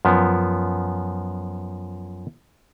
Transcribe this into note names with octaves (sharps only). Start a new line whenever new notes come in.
F#2 F3 B3